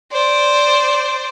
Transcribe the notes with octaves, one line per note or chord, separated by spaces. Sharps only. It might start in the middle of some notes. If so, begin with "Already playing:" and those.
C5 D5